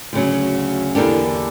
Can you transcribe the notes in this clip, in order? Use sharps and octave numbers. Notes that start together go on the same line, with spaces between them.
D2 C#3 F#3
E2 D3 A#3 D4 G4